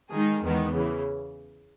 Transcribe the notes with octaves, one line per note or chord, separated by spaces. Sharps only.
D#3 G#3 D#4 G#4
E2 D#3 G#3 B3
C#3 E3